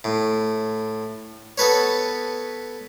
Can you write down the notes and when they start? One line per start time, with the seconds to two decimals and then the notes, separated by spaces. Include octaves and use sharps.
0.04 A2
1.58 B3 A4 B4 C#5